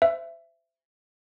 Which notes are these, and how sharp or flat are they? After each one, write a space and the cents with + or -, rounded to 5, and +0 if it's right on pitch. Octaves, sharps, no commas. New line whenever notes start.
C5 -20 E5 +20